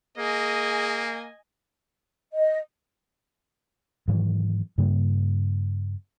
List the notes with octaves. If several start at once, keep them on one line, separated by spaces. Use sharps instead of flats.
A#3 G#4 D#5 G#5
D#5
G#2 D#3 E3 F#3
G2 C#3 G3 A#3